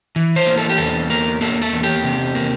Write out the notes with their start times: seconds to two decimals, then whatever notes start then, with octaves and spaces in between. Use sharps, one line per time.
0.16 E3
0.36 C5
0.46 A#3
0.58 A4
0.69 G4
0.78 E2 A4
1.10 A#3 A#4
1.41 A#3 A4
1.62 A4
1.73 E2
1.83 G4
2.04 C3
2.35 A#3